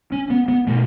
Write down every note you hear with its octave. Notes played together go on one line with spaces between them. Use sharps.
C#4
B3
B3
B2 A3